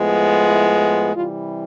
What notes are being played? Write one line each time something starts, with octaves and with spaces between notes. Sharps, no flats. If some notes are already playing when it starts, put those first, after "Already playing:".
Already playing: A2 F3 G#3 B3
E4
C3 E3 G3 F4